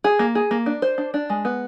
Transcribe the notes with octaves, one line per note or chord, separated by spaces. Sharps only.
G#4
A#3
G#4
A#3
D4
C5
D4
D4
G#3
B3